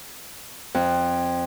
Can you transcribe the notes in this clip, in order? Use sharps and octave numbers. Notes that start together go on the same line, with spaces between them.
F2